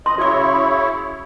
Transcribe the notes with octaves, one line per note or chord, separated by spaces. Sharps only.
D#5 C6
C#3 E4 F#4 C#5 D6